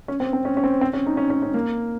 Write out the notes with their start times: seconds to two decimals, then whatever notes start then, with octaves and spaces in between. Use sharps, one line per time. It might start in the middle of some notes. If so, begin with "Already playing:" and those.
0.08 C#4
0.20 C4
0.33 C4
0.45 C#4
0.57 C#4
0.64 C4
0.81 C4
0.93 C#4
1.06 D#4
1.17 C#4
1.30 C#4
1.42 C#4
1.54 A#3